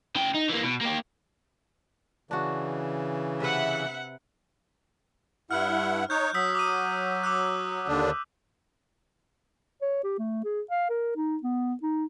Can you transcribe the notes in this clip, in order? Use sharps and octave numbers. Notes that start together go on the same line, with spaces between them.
C#3 G5
D#4
E3 A#3
B2
A#3 G4
C#3 E3 D4 F#4
C3 B4 E5 F#5
G2 E4 F#5 F6
D#4 C#5 F#6 G6
F#3 D#6 E6 B6
D6 D#6 D#7
D6 E6 F#6
D#2 D3 D4
C#5
G4
A3
G#4
F5
A#4
D#4
B3
D#4